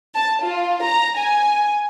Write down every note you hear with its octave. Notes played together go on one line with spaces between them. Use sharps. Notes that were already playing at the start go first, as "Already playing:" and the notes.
A5
F4
A#5
G#5